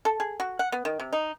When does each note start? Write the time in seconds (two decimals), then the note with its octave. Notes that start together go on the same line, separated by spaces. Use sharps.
0.05 A4
0.20 G#4
0.40 F#4
0.59 F#5
0.72 B3
0.85 D#3
1.00 C3
1.13 D#4